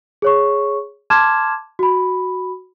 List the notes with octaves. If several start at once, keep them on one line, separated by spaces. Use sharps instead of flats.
G#4 C#5 C#6
A5 C6 D6 F6 G#6 E7
F#4 B5